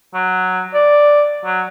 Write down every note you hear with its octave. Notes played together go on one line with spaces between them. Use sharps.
F#3
D5
F#3